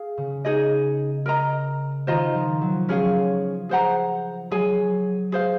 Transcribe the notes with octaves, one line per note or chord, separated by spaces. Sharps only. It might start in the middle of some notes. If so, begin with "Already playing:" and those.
Already playing: G#4 F5
C#3
D#4 G#4 D#5
A#4 D#5 A#5
D#3 F4 C5 D#5 A#5
F3
F#3
F3 C#4 G#4 C#5 F5
G#4 C5 F#5 A#5
F#3 G#4 C#5 G#5
G#4 C5 F5